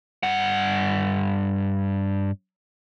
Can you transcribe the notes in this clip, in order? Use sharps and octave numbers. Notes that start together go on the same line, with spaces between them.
G2 F#5